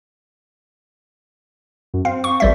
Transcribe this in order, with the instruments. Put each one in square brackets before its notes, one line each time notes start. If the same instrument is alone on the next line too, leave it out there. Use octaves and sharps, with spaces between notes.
[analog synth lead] F#2
[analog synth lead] C4 [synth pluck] F5
[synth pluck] C#6
A1 G3 E5